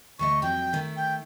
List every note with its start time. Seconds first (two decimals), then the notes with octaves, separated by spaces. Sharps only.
0.19 D2 A3 D#5 C#6
0.42 F2 F#3 G5
0.73 D#3 A3
0.96 G5